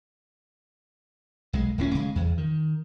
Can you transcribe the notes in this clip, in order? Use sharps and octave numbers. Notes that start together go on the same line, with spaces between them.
B1 G#3
D1 A2 B3 C#4
C#3 G#3
E2
D#3